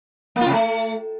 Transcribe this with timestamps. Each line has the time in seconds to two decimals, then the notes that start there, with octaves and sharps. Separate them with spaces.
0.36 A#3
0.41 F4
0.46 C3
0.51 A3